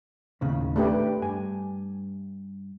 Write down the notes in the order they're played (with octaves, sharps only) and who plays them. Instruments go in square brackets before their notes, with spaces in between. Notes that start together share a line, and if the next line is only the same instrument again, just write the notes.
[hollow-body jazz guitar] D#2 A2 C#3
[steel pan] A3 G4 B4 [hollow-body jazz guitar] D4
[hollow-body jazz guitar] G2 G#5